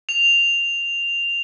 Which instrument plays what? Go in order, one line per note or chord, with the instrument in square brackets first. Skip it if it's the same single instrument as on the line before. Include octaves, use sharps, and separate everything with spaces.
[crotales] F7